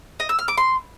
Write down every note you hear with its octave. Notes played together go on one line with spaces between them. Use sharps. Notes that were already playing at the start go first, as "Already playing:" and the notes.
D#5
E6
F6
D6
C6